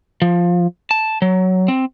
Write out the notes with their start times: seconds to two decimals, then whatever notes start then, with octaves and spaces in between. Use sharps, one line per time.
0.22 F3
0.91 A5
1.22 F#3
1.68 C4